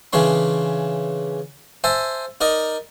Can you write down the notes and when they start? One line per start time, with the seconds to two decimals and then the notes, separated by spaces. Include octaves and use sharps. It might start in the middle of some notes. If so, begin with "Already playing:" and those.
0.13 C#3 E3 D4 C#5 C6
1.84 C5 E5 G#5 A5
2.41 D#4 A#4 D5 D#5